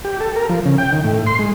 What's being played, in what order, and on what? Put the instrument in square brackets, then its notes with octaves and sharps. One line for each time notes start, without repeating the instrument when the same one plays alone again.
[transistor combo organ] G4
A4
A#4
F3
C#3
G5
D#3
A2
C6
G#3